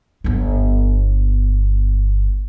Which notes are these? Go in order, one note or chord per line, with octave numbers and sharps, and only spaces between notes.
G1 B3